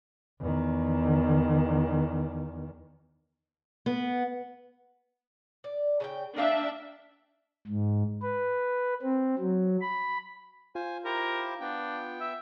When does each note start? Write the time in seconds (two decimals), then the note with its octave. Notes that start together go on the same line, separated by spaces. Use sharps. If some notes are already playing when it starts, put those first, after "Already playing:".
0.40 E2 D#3
3.86 B3
5.64 D5
6.00 C#3 G#4 G5
6.37 D4 A#4 E5 F5 G5
7.68 G#2
8.22 B4
9.02 C4
9.39 F#3
9.81 B5
10.75 F4 C5 G#5
11.05 E4 G4 A#4 C5
11.61 B3 D4 G5
12.20 E5